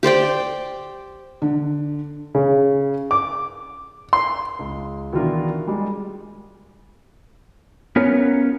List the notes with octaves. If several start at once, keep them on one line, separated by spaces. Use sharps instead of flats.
G4 C5 D5 G5
D3
C#3
D6
C6
C#2
B2 D#3 E3 D4 F4 A#4
G3 G#3
B3 C#4 F4 A#4 C#5